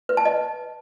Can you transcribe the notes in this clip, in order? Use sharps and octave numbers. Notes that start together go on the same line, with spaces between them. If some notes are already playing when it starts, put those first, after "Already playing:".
B4
A5
D#5